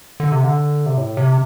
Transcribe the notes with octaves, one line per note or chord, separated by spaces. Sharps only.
D3
C3
D3
C3
A2
C3